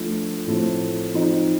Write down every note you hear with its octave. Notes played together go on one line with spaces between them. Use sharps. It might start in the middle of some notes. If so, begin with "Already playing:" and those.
Already playing: F3 A3 D4 F4
A2 F3 A3 C4
F3 C4 D#4